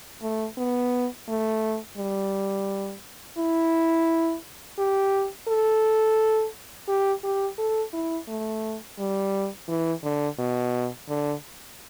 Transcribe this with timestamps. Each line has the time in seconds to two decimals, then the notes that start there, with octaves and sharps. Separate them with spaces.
0.22 A3
0.58 B3
1.28 A3
1.97 G3
3.38 E4
4.78 G4
5.48 A4
6.88 G4
7.23 G4
7.58 A4
7.93 E4
8.28 A3
8.98 G3
9.68 E3
10.03 D3
10.38 B2
11.08 D3